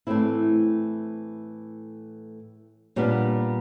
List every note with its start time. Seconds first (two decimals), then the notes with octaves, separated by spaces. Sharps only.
0.07 A2 E3 A3 C4 E4
2.96 A#2 G3 B3 D4